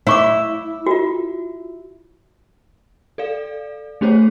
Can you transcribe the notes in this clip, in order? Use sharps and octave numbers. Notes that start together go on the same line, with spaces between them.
E4 C#5 C#6 D6
F4 F#4
A4 D5 F5
A3 C#4 G#4 C5 C#5